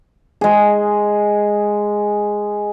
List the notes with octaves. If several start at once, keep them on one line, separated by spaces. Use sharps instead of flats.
G#3 G#4